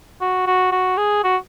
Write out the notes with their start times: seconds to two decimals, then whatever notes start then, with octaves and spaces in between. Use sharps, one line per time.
0.21 F#4
0.47 F#4
0.72 F#4
0.98 G#4
1.24 F#4